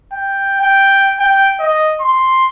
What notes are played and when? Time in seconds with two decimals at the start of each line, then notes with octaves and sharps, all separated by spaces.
0.12 G5
0.61 G5
1.19 G5
1.59 D#5
2.01 C6